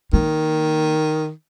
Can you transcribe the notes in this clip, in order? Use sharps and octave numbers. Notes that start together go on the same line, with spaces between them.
D#3 A#3